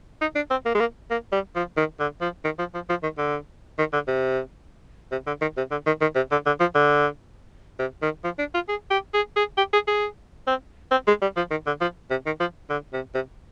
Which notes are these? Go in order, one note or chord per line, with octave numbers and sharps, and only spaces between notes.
D#4
D4
C4
A#3
G#3
A#3
A#3
G3
F3
D#3
D3
F3
D#3
F3
F3
F3
D#3
D3
D#3
D3
C3
C3
D3
D#3
C3
D3
D#3
D#3
C3
D3
D3
F3
D3
C3
D#3
F3
D4
F4
G#4
G4
G#4
G#4
G4
G#4
G#4
C4
C4
G#3
G3
F3
D#3
D3
F3
C3
D#3
F3
D3
C3
C3